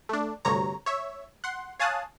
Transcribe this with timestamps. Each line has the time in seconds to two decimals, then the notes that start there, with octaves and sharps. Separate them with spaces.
0.09 A3 D4
0.45 D2 G2 C3 C#5 A#5
0.86 C#5 E5
1.44 F#5 C6
1.79 C#5 F5 G#5 A5 D#6 F#6